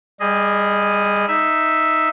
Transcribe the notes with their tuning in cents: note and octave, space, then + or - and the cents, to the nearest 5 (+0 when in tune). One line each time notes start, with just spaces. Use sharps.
G3 +25 G#4 +0 D#5 +0
D#4 +0 E5 +0